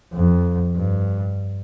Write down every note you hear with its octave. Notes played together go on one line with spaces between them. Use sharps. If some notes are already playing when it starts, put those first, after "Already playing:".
F2
G2